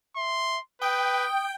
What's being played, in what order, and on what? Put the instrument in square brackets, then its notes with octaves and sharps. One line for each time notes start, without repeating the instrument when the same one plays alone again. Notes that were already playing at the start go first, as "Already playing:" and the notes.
[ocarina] E5 [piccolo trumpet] C6
[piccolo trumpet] B4 [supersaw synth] G5 [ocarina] D#6